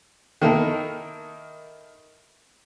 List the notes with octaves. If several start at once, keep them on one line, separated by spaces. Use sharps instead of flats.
D#3 A#3 D#4 E4 A4 A#4